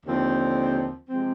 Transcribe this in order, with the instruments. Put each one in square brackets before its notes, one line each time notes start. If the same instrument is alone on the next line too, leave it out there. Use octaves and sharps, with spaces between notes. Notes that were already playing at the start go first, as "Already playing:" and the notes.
[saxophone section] D#2 D3 F3 C4
C3 F3 G#3 C4